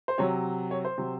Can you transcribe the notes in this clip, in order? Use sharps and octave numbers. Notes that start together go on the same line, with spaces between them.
C5
C3 F#3 C#5
C#5
C5
C3 F#3